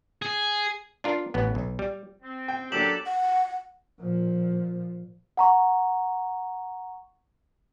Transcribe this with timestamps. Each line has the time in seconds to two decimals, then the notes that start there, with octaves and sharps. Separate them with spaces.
0.22 G#4
1.04 D4 F4 A#4
1.34 A1 B3
1.55 B1
1.79 G3
2.22 C4
2.48 G5
2.72 F#3 A#3 D4 G4 A4 D6 E7 F#7
3.06 F#5
4.00 A#2 F3
5.37 F#5 A#5 C#6